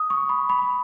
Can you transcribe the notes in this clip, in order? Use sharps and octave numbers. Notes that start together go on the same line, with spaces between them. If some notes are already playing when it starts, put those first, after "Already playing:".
Already playing: D#6
C#6
B5
B5